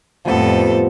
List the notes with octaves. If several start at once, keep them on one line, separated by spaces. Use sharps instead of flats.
F2 A2 F3 G3 B3 A4